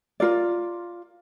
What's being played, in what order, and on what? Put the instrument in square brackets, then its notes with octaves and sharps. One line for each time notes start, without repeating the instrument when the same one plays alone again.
[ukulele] F4 A#4 D5